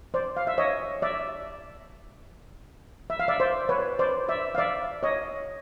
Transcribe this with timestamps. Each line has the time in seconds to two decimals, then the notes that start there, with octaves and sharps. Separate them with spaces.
0.14 C5 D5
0.37 F5
0.47 E5
0.58 C#5 D#5
1.02 D5 E5
3.10 E5
3.20 F5
3.28 D5 E5
3.40 C5 D5
3.69 B4 C#5
3.99 C5 D5
4.29 D5 E5
4.55 F5
4.58 D5 E5
5.03 C#5 D#5